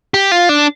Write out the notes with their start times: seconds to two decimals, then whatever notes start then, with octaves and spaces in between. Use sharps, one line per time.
0.14 G4
0.32 F4
0.49 D4